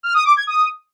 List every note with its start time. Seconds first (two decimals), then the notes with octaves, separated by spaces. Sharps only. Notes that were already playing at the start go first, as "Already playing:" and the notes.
0.03 F6
0.14 D#6
0.25 D6
0.36 G#6
0.47 D#6